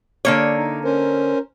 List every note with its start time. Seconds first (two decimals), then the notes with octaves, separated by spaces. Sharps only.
0.25 D3 A#3 C#5
0.58 D#4
0.84 C#4 A#4 C5